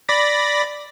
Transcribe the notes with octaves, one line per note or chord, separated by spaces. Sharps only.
D5 B5 A#6